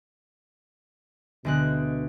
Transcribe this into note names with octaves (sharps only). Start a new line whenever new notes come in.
D2 B2 G#3 F#6